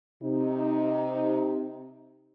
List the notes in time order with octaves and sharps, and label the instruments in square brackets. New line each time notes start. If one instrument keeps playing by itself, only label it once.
[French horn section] C3 D#4